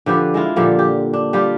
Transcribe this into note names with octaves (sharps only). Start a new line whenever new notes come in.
D3 F3 G4 B4
G#3 E4 F4
A#2 D3 F3 G3
G4
D4
G3 F4 G4